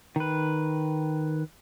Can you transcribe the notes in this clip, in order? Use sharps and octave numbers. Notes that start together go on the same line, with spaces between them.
D#3 B4